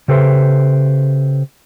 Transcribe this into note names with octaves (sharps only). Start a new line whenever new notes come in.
C#3 G4 A4 B4 C5 E5